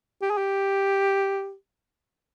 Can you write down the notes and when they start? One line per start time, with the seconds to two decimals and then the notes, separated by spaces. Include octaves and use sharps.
0.22 G4
0.30 G#4
0.38 G4